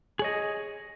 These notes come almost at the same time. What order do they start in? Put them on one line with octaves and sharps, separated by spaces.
G#4 C#5 D#5